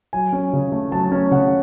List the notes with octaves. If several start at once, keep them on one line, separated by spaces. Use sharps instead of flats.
F#3 G#5
C#4
C#3
A3
F#3 A5
C#4
C#3 F#5